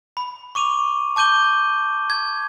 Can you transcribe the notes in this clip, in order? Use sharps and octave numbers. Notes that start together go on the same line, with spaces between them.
B5
C#6 D6 D#7 F7
A5 D6 G6 D#7 G7
G#6